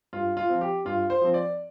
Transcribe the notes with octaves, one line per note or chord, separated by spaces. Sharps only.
G2 F4
F4
F3 C4
G4
G2 F4
C5
F3 C4
D5